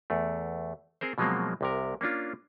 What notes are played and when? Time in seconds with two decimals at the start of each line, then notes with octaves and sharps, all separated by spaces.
0.10 E2 A3
1.01 C4 G#4 A#4 C5
1.18 B2 F3 F#3 G#3 A#3 C4
1.61 C2 C3 A#4
2.01 A#3 C#4 D4 F4